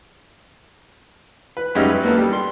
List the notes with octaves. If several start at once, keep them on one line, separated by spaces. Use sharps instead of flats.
B4
F#2 G3 G#3 C#4 D#4 E5
B4
A#3 B3 A4
G3
C6